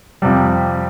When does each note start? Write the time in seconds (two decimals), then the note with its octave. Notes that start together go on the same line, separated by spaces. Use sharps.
0.22 F2 C3 G3